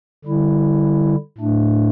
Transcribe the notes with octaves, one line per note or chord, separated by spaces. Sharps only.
D3 G3 E4
A2 A3 D4